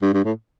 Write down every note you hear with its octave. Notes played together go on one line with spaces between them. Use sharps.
G2
G2
A2